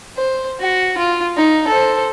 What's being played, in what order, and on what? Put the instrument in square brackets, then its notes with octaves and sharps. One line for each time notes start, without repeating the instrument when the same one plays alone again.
[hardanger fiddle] C5
F#4
F4
D#4
A4 C5